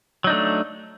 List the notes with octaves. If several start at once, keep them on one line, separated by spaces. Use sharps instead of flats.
F#3 A3 D4 D#4